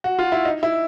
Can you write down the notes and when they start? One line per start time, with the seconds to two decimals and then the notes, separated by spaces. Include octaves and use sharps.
0.04 F#4
0.19 F4
0.32 E4
0.45 D#4
0.63 E4